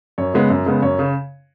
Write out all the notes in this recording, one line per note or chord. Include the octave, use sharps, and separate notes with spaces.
F#2 C#5
C#3 G#3 B3
F#2
C#3 G#3 B3
F#2 C#5
C#3